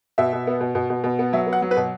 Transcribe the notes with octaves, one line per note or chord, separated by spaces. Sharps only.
B2 E5
B2
B3
B2
B2
B2
B2
B3
F#3 E5
B3
F#5
F#3
B4
B2